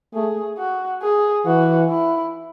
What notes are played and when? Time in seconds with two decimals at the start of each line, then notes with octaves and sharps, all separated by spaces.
0.14 A3 G#4
0.58 F#4
1.02 G#4
1.46 E3 F#4
1.90 E4